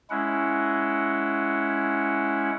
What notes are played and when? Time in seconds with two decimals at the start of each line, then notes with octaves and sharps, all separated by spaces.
0.10 G#3 C#4 E4 F#5